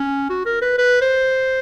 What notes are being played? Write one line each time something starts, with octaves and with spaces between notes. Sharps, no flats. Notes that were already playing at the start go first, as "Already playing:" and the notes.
Already playing: C#4
F#4
A#4
B4
B4
C5